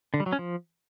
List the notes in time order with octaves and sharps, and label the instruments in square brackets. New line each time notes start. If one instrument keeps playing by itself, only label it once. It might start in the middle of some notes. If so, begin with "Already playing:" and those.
[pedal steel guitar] D3
G3
F#3
C#4
F3